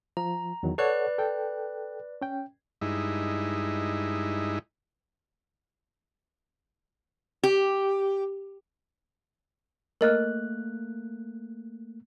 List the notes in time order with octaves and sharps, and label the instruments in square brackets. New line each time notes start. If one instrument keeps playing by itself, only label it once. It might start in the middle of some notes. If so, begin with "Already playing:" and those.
[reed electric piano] F3 [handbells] A#5
[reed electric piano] E2 D#3 F#3
[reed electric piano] A4 C#5 F#5 [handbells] B4 D5 F#6
[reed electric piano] A4 G5
C#4 G5
[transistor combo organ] G2 G#3 D#4 E4
[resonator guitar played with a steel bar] G4
[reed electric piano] A3 A#3 F#6 [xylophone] A#4 D#5 F6